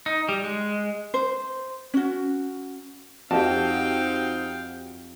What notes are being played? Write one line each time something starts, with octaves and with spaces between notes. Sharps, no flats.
D#4
G3
G#3
C5
C#4 F#4
F2 C4 D#4 F#4 G4 F5 G5 A5